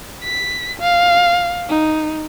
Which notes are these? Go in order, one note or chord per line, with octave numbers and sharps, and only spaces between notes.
B6
F5
D#4